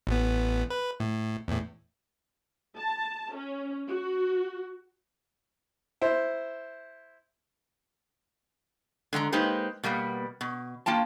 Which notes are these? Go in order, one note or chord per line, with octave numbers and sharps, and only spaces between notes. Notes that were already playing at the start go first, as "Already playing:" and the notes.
A1 B3
B4
A2
E2 A2
A5
C#4
F#4
E4 C5
D3 G#3 G5 A#5
G#3 A#3 D#4 G4 B4 C5
B2 G3 A#3 B3
B2
A#3 F4 G5 A5